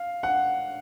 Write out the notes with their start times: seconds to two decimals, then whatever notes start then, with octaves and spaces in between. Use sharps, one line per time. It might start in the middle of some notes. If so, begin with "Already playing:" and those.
Already playing: F5
0.23 F#5